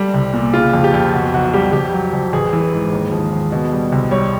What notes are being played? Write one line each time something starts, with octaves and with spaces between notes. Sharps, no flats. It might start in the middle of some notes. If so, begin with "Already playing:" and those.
Already playing: G3 A4
C2
A#2
C#3 F4
F2
G4
F2
B2 F#4
B1 F#4
G3 G4
F2 G4
F#3
F2
A1 G#4
E3
G#2
D#2
F3
D#2
B2
G3
C2
G3 C#5